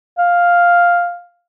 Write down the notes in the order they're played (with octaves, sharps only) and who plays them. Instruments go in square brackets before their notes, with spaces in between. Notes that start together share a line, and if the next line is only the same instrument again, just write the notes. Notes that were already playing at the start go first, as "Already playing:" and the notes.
[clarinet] F5